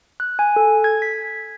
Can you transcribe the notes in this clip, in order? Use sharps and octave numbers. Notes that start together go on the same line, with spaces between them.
F#6
G#5
A4
G#6
B6